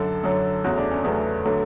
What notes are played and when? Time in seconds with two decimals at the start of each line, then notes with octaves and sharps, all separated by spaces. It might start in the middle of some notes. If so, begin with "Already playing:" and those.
Already playing: F#2 D3 F#3 A4
0.24 F#2 D3 F#3
0.64 E2 C#3 F#3 A3 F#4
0.78 D4
0.91 C#4
1.04 E2 C#3 F#3 A3 B3
1.45 D3 F#3 A3